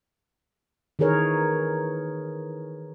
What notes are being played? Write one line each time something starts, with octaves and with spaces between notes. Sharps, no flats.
D#3 E3 G#4 A#4 C#5